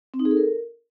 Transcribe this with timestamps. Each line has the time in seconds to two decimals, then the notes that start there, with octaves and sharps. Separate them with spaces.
0.14 C4
0.19 D#4
0.25 G#4
0.31 A4
0.37 A#4